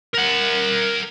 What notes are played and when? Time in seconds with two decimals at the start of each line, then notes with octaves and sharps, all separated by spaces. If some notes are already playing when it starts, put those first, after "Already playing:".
0.15 A#4 F#5